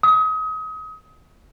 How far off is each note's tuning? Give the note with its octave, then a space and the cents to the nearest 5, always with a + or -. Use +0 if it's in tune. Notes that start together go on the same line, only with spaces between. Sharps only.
D#6 +30